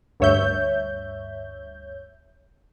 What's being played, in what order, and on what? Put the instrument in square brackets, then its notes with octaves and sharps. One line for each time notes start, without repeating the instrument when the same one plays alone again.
[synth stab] D2 G2 C#5 E5 G6